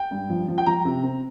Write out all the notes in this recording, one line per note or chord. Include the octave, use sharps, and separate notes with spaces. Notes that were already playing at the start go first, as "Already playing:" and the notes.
Already playing: G5
G2
F3
F3
G5
F3 A#5
C3
C4